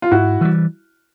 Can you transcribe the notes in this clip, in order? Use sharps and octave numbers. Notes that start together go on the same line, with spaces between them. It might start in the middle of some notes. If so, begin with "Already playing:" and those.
F4
G#2 E4 F#4
E3 G3